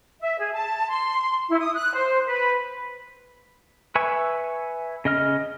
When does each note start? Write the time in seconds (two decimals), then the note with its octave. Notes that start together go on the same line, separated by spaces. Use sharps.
0.20 E5
0.38 G#4
0.54 A5
0.89 C6
1.48 E4
1.60 D#6
1.75 F#6
1.95 C5
2.27 B4
3.95 B4 E5 G#5 C#6
5.05 C#3 D#5 F6